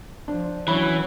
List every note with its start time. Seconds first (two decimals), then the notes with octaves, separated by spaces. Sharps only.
0.28 F3 D4
0.68 E3 F#3 C#4 B5